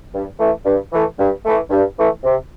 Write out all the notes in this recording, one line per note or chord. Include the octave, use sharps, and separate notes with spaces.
G2
E3 A3
G2
E3 A3
G2
E3 A3
G2
E3 A3
C3